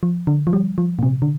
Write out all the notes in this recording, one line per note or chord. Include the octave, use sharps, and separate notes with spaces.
F3
D3
F3
G3
F3
A#2
C3
D3